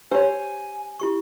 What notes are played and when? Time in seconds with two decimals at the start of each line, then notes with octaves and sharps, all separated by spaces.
0.11 G4 C5 C#5 G#5
1.00 E4 G4 C#6